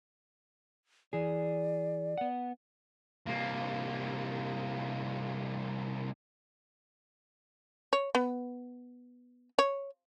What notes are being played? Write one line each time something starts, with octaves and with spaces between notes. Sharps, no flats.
E3 G#4 D5
B3 F#5
C2 A#3
C#5
B3
C#5